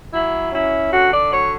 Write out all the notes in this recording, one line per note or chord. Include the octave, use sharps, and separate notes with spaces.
F#3 E4
C#4 E4
D3 F#4
D5
F#3 C#5